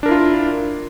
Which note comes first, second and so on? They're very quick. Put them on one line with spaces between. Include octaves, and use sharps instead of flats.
D4 A#4 E4 F4